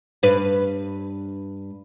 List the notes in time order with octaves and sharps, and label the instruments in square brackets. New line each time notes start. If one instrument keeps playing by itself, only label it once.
[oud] G2 B4